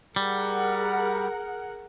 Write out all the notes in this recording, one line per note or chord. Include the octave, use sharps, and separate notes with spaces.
G3 G#4 A#4 F#5